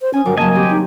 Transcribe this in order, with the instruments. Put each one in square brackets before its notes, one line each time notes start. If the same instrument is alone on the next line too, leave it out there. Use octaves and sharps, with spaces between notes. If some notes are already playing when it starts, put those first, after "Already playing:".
[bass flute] C5
[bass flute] C#4 [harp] G#5 D#6
[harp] G1 G3 D6 [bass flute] F#3 [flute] A#4
[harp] C#3 F#3 [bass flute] A#3 [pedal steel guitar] D#5 G#5 [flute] A5
[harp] C4 [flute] G4
[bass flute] D#4